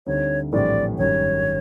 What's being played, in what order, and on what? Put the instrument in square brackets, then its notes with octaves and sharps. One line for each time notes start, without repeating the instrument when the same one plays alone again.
[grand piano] D2 D3 G3 C4 D#4 [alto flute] C#5
[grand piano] A#1 A2 E3 G3 C4 [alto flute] D5
[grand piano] G#1 F#2 D#3 G3 [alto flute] C#5